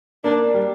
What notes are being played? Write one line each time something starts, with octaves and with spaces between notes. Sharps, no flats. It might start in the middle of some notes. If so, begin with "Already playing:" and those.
A#3 D4
G3